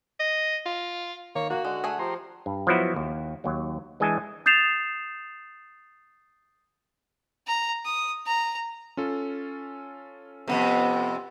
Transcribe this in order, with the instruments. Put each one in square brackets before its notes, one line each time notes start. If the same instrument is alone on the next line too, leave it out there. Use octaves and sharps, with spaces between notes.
[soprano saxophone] D#5
F4
[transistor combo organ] D#3 [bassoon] A#3 [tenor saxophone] C#5
[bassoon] A#3 [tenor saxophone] F#4
[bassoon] D3 [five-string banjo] G#3 [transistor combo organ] F#5
[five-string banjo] A3 G#4 G#5
[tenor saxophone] F3 [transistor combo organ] G4 A#5 C6
[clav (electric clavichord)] G2
F3 F#3 B3 E4 F#4
D#2
D#2 F#3
E3 G#3 D4 D#5 G#5 A5
[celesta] D#6 G6 A6 C7 E7 F7
[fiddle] A#5
D#6
A#5
[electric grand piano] C#4 F4 A4
[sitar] F2 A2 C3 [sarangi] B3